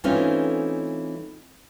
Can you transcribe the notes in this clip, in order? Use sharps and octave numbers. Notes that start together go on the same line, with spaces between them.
E3 A3 C4 C#4 D#4 F4